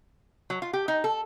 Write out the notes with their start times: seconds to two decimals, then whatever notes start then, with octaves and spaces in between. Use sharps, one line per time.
0.50 F#3
0.62 F4
0.73 G4
0.88 D#4
1.04 A4